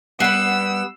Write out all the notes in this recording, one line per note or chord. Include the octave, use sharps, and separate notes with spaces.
G3 B3 B4 F#5 E6 C7